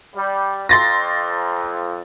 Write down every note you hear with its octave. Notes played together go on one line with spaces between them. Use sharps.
G3
F2 C6 A6 A#6